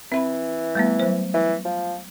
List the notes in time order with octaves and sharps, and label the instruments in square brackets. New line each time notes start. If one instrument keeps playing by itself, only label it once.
[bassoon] E3 [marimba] C4 E5 B5
[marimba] G3 A3 B3
F#3 C5
[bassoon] E3
F3